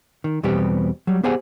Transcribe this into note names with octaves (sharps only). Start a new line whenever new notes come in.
D#3
E2 B2 G3 B3 C4 G4
F#3 G3
B3 G4 G#4 C5 F#5 G#5